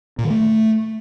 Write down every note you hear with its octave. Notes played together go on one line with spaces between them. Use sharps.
A#2
D#3
A3